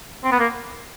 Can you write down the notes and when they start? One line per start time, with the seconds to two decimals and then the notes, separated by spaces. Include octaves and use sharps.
0.24 C4
0.32 B3
0.39 A#3